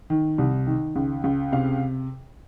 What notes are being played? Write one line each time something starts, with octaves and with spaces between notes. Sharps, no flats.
D#3
C2
D#3
C#2
C#2
C3 F5